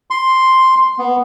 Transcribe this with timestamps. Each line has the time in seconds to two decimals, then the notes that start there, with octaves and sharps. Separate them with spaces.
0.10 C6
0.99 B3